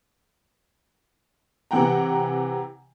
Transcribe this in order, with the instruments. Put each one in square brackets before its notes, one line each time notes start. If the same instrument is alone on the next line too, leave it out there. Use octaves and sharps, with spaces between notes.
[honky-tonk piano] C3 E3 F#5 G5 A#5